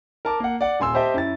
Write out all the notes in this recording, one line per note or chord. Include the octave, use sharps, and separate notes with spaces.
A#4 A5 D6
A#3 F#5
D5 F#5
D#1 G#5 C6 E6
G4 C5 D#5 E5 G5 A5
F#2 E4 A6